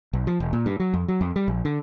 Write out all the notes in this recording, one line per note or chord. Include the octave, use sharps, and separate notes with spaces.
B1
F3
E1
A#2
G2
F#3
F2
F#3
F2
G3
A#1
D3